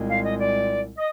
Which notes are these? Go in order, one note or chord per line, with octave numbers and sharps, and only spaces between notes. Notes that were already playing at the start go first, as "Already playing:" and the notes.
Already playing: C2 A#2 G#3 C4
F5
D#5
D5
D#5